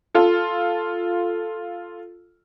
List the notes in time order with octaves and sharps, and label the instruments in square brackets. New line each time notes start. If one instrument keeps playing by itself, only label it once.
[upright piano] F4 A4